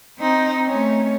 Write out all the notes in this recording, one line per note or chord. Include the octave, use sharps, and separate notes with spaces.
C4 D#4
A3 C#4